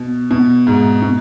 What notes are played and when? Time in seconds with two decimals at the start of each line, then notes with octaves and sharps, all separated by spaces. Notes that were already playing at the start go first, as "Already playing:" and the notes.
Already playing: B2
0.31 B2
0.67 G#2
1.02 B2